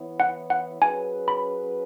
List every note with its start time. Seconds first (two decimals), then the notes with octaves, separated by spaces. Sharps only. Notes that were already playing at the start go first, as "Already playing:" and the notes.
Already playing: E3 B3 E4 C#5
0.20 F#5
0.50 F#5
0.82 F#3 C#4 G#4 B4 G#5
1.28 B5